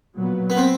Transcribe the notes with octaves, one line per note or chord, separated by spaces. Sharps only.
A#2 F#3 B3
B3
C4